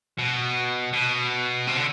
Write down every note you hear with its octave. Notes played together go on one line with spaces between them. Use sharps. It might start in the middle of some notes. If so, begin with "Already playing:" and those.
B2
B2
C3
D3